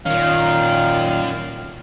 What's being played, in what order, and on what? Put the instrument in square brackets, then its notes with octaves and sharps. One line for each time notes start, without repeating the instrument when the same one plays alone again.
[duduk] A#2 [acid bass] D#3 [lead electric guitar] C#4 A#4 [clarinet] F5